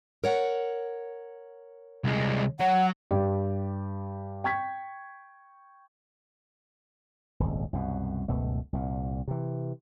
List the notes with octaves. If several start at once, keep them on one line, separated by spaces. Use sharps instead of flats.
A#4 C#5 F#5
C2 G#3
F#3 F#5
G2 G4 D5
G5 C#6 G#6 B6
D#1 G#1 C#2
C2 F#2 B2
F#1 C#2 B2 A3
C2 A#2
C3 E3